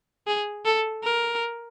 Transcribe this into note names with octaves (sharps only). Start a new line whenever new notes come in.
G#4
A4
A#4